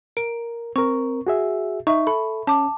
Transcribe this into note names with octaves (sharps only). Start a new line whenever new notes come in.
A#4 D7
C4 A#4 C#6
F#4 G#4 E5
D#4 E5 C#6
A4 B5
C#4 A5 D6